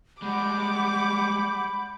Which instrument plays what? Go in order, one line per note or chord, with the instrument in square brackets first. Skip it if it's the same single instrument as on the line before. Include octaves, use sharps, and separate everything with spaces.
[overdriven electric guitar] G3 G#3 [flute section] F#5 G6 [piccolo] B5 [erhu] D6